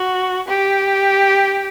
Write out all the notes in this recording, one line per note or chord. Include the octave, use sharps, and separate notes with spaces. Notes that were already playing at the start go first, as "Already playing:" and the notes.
Already playing: F#4
G4